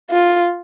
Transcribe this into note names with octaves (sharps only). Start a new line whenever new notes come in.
F4